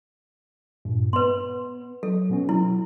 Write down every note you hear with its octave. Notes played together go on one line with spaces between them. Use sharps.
G2 A#2
B3 B4 C6
F#3 A4
B2 B3 C#4
F#3 E4